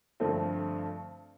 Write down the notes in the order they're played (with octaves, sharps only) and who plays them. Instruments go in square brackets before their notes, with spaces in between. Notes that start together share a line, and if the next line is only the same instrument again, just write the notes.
[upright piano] G2 D3 F3 A3 C4